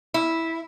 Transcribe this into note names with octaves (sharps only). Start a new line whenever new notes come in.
E4